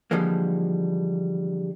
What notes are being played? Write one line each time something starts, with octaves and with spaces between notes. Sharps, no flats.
D3 E3 F3 G3 G#3 A#3